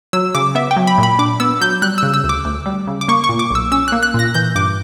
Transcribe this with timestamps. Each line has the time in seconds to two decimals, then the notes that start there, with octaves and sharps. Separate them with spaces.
0.13 F#3 E6
0.35 C#3 D6
0.55 B3 E5
0.71 G5
0.77 F#3
0.87 B5
0.98 A#2
1.03 B5
1.19 D4 D6
1.40 B3 E6
1.61 F#3 G6
1.82 G3 F#6
1.98 C#3 E6
2.14 E6
2.24 D2
2.29 D6
2.45 D2
2.66 G3
2.87 C#3
3.01 D6
3.08 A#3 C#6
3.24 C#6
3.29 A#2
3.39 D6
3.50 B1 E6
3.72 C#4 E6
3.88 A#3 F#6
4.03 F#6
4.14 A#2 A#6
4.34 E3 G6
4.55 G2 D6